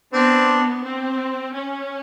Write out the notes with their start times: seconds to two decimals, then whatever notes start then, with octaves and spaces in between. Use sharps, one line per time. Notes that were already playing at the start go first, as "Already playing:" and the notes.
0.12 B3 C4 D4
0.83 C4
1.54 C#4